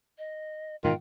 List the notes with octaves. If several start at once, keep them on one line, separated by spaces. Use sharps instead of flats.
D#5
G#2 B2 D#3 E3 F4 G5